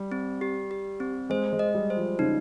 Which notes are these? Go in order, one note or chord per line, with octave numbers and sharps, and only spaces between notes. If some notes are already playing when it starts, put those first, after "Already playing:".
Already playing: G3
C4
G4
G4
C4
G#3 C5
G#3
D#5
G3
C5
F3
C#3 D#4